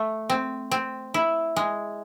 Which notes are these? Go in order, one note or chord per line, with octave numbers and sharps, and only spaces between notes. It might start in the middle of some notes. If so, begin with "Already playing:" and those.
Already playing: A3
C4
C4
E4
G#3